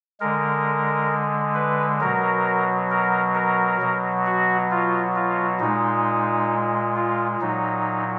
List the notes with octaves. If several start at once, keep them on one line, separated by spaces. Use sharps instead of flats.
D3 G#3 A#4
B4
B2 F#3 A#4
A#4
A#4
B2 F#3
F#4
F4
F4
A#2 G#3 D#4
F4
A#2 F#3 D#4